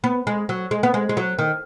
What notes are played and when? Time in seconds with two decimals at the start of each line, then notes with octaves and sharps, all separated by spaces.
0.04 B3
0.27 G#3
0.49 F#3
0.71 G#3
0.83 B3
0.94 G#3
1.09 G#3
1.17 F#3
1.39 D#3